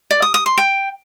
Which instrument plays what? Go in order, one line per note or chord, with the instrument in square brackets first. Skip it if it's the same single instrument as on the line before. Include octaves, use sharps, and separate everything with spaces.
[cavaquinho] D5
D#6
D#6
C6
G5